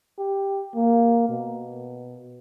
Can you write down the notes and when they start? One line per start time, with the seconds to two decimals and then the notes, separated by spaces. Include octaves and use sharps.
0.18 G4
0.75 A#3
1.29 B2